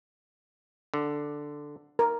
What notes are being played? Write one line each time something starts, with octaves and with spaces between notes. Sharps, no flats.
D3
A#4